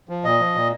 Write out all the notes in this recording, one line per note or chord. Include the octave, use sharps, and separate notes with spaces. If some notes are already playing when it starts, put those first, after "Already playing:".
F3
A#2 D#5
F3
A#2